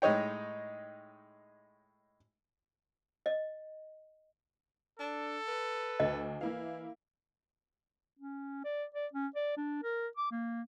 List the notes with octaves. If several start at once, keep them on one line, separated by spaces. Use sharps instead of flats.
A2 G#3 D#4 C#5 G5
D#5
D4 A4
B4
D2 D#5
E3 A#3 E4 F5
C#4
D5
D5
C#4
D5
D4
A#4
D6
A#3